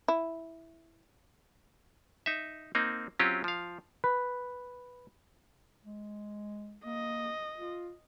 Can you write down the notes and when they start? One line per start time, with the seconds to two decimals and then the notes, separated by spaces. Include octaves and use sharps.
0.08 E4
2.26 D#4 E5
2.75 A#3 C4 D#4
3.19 F#3 C4 C#4 F4 G4
3.44 F3 F5
4.04 B4
5.85 G#3
6.85 A#3 D#5
7.57 F4